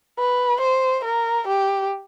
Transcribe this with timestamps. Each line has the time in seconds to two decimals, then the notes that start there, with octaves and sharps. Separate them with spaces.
0.19 B4
0.61 C5
1.05 A#4
1.48 G4